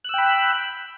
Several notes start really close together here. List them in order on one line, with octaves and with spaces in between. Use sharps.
F#6 E6 G5 B5